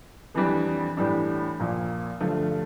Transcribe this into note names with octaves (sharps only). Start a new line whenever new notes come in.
F2 E3 G3 D4
A2 E3 G3 D4
A#1 A#2 F3 A#3
G2 D3 F3 A3